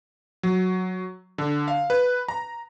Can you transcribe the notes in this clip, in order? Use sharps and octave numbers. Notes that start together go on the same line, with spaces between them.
F#3
D3
F5
B4
A#5